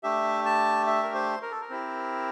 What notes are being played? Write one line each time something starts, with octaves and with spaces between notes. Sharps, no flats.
A3 D4 G4 E5
A5
E5
A#4
C5
A#4
A4
A#4
C4 E4 G4